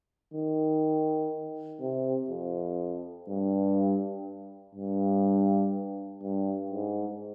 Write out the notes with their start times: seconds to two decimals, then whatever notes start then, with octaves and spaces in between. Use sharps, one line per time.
0.34 D#3
1.81 C3
2.30 F2
3.28 G2
4.75 G2
6.22 G2
6.71 G#2